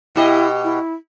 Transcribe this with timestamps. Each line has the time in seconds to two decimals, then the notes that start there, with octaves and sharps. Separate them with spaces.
0.16 B2 E4 G4 D#5
0.64 E4